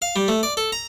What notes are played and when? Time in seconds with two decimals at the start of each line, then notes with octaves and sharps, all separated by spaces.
0.02 F5
0.16 G3
0.28 A3
0.43 D5
0.57 A4
0.72 A#5